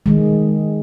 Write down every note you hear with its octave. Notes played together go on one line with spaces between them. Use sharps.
D#3 G#3